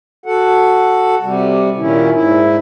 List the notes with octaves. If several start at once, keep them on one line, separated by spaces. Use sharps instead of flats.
F#4 A4 F#5
C3 G3
A#2 D#3 C#4 E4
G#2 E4